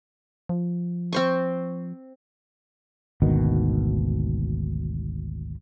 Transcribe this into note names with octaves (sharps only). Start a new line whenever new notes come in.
F3
C4 C5 C#6
G#1 D2 B2 D#3